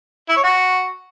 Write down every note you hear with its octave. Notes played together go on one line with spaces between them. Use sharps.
E4
C#5
F#4